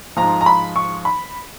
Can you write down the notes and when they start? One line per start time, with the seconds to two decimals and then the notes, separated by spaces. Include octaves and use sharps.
0.17 G#2 F3 A#5
0.41 A#5
0.46 B5
0.76 C#6
1.05 B5